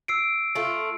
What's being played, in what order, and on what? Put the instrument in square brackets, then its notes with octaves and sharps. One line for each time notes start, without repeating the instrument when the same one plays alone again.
[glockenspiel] E6 C7 D7
[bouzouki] A3 F4